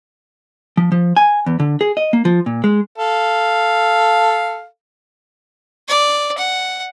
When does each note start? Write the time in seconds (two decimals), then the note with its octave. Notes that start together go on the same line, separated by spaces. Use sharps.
0.77 F3
0.92 F3
1.16 G#5
1.46 E2
1.60 D3
1.81 G#4
1.97 D#5
2.13 A#3
2.25 F3
2.46 A#2
2.64 G#3
2.98 A4 F5
5.88 D5
6.38 F#5